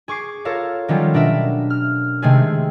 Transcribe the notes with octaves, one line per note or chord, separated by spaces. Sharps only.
G#4 C#6 D6 C7
F4 A4 A#4 C#5 F5
D#3 F#3 G3 C#4 F4 A4
B2 D4 A#4 E5
F6
C3 D#3 G#3 A3 C4 G#4